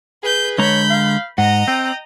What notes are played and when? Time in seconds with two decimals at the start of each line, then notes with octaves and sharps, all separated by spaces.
0.23 G#4 B4 G6
0.58 D3 G#3 C#5 A#5 B5 G6
0.90 F5
1.38 G#2 D#5 F#5 A#5
1.68 C4 G5